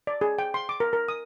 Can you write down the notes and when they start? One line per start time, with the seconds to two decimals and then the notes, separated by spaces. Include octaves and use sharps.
0.07 D5
0.21 G#4
0.39 G5
0.54 C6
0.69 D6
0.80 A#4
0.93 A#4
1.08 D#6